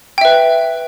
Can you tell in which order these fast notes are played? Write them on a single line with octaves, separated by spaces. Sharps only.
G5 E5 B4